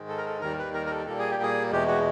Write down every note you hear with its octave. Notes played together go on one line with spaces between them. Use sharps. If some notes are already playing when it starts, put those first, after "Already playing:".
Already playing: G#2 D#3 G#3
A4
A#4
A4
D#2 D#3 G3 A#4
B4
A#4
A#4
A4
A#2 G3 A#3 A4
G#4
G4
G#4
E2 B2 G#3 G4
F#4